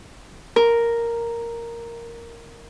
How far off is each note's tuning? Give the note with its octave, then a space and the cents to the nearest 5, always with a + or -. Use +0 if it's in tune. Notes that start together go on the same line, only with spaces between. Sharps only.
A#4 +0